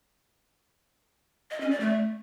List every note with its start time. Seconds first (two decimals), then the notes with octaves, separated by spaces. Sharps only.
1.51 D#5
1.61 C#4
1.71 D5
1.80 A3